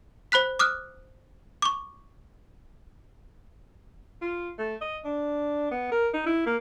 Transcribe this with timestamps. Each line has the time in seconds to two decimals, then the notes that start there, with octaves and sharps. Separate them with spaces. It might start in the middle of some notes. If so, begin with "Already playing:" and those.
0.32 C5 B5 F#6 B6
0.59 D6 D#6 F6 F#6
1.62 C#6 D6
4.22 F4
4.59 A3
4.81 D#5
5.05 D4
5.71 B3
5.92 A#4
6.14 D#4
6.27 E4
6.46 A#3